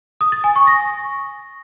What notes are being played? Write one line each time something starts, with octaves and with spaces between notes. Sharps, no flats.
D#6
A6
G#5
C#6
A#6